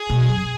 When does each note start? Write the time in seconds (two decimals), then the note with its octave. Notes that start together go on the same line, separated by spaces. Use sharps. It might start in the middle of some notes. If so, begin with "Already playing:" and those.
Already playing: G#4
0.10 B2
0.25 F#2